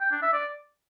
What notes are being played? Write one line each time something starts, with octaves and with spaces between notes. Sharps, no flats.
G5
D4
E5
D5